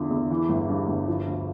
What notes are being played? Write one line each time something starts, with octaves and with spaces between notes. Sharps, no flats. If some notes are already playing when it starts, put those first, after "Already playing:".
Already playing: E2 D3 F3
E2
E3
G1
G2
G1
F3
D2